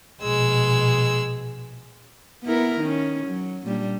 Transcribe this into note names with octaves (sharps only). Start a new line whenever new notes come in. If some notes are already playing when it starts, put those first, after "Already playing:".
A#1 B2 G#3 E6
B3 E4 A#4
D#3 C#4
F#3
A#2 G3 D4